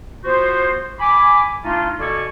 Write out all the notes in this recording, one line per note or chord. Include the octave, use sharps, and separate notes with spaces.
B3 F4 F#4 C5
G#5 B5 D6
A3 D4 D#4 F4
B2 A4 D5 G#5 C#6